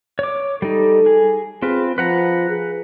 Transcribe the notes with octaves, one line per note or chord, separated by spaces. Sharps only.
C#5 D6
G3 D#4 A4
G#4
C4 F4 G#4 B4
F3 B4 F#5 A#5
G#4